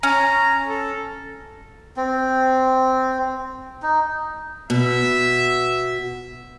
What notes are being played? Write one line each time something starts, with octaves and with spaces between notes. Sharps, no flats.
C#4 A#5
A4
C4
D#4
B2 E5